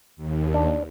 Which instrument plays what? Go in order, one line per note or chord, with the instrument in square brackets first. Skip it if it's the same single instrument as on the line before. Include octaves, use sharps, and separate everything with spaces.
[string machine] D#2
[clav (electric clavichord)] D4